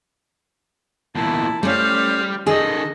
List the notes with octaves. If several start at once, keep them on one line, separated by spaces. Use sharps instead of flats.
E2 A#2 E4 A5
G3 A3 C#4 C5 F5
D#3 G#4 A4 D#5